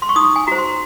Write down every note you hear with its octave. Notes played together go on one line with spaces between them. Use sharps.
C6
C#6
D#4 D#6
G#5
F#4 C5 A#5
C6